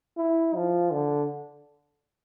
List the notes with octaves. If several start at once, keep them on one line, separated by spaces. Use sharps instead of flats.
E4
F3
D3